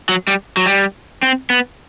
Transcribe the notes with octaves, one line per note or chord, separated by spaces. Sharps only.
F#3
G3
F#3
G3
C4
B3